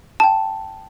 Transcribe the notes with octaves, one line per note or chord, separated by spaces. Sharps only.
G5 A5